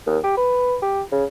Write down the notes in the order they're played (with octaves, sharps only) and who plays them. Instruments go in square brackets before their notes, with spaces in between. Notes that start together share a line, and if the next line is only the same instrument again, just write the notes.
[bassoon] D#2
G4
B4
G4
C#3